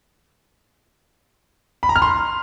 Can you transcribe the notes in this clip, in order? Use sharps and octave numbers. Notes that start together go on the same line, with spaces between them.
B5
A#5
F6
C6